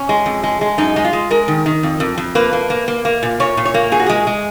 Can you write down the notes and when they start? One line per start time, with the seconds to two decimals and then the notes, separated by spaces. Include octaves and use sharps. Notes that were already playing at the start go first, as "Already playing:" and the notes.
Already playing: C#4
0.09 G#3
0.26 F2
0.43 G#3
0.61 G#3
0.78 F#2 D#4
0.96 G#3
1.04 F4
1.13 G#3
1.31 G#3 A#4
1.48 D#3
1.66 D#3
1.83 F2
2.00 F2
2.18 F2
2.35 A#3 B4
2.53 A#3
2.70 A#3
2.88 A#3
3.05 A#3
3.23 A#2
3.40 A#2 C#5
3.57 A#2
3.65 C#5
3.74 A#3
3.92 A#2 G#4
4.00 F#4
4.06 G#3 G#4
4.27 G#3